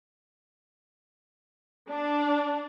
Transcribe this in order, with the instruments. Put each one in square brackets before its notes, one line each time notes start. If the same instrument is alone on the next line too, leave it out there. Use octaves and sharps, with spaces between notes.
[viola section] D4